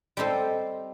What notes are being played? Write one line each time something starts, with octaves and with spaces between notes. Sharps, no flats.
G3 C4 D#4 A4 C5